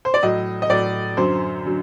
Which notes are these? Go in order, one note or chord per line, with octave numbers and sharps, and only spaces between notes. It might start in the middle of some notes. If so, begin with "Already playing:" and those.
C5
D5
A2 F#3 D#5
D#5
A2 F#3 D5
F#2 D3 F#3 C5
D3 F#3